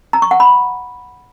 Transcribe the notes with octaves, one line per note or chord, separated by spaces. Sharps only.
A#5
C#6
F#5
B5